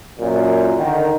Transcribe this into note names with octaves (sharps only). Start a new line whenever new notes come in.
F#2 A#2
D3 D#3